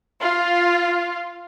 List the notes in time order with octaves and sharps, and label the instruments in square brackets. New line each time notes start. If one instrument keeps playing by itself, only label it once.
[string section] F4